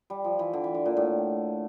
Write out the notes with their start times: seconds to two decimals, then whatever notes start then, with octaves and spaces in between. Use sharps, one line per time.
0.10 G3
0.24 F3
0.39 E3
0.53 D3
0.64 E3
0.74 D3
0.86 A#2
0.97 A2